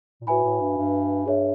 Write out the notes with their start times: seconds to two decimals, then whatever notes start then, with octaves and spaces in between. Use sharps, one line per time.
0.21 A#2
0.27 A2 F#4 B4 E5 G#5 B5
0.44 A2
0.60 G2
0.77 G2
1.26 G2 G#4 C#5 E5